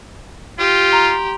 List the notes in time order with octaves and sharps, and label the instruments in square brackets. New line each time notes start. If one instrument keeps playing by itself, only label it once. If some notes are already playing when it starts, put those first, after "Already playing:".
[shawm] F4 [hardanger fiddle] G4
[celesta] A#5 C6 F7